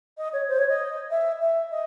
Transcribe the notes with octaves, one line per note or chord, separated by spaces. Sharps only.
D#5
C#5
C5
C#5
D#5
E5
E5
D#5